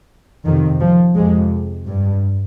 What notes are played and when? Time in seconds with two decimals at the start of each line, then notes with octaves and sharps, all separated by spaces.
0.45 F2 C3 D#3
0.80 F3
1.15 F2 C3 G#3
1.86 G2